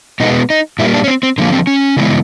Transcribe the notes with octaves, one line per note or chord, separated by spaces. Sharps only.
B2 G#3 B3 D#4
D#4
A#2 G3 A#3 E4
D4
C#4
C4
C4
D3 F3 A#3
C4
C#4
C#3 E3 G#3 B3